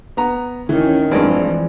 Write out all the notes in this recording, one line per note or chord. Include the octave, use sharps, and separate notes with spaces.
B3 A#5
D2 D#3 E3 C#4
F1 G2 E3 F3 G#3 C4 G#4 D5